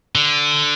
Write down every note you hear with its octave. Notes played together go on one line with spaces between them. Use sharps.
D3